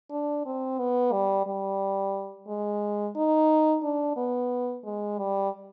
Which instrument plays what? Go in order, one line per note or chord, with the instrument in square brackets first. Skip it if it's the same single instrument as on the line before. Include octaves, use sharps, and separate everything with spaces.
[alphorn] D4
C4
B3
G3
G3
G#3
D#4
D4
B3
G#3
G3